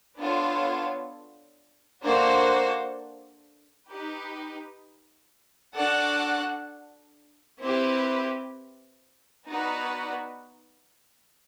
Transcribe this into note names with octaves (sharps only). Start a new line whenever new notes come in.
B3 D4 F4 A4 C#5
A#3 D4 F#4 A4 C5
D#4 G4 B4
D4 F#4 A4 D5 F#5
C4 E4 G4 B4
B3 D#4 F#4 B4 D5